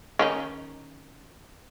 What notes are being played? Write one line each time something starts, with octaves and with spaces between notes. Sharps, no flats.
D#3 C#4 D#4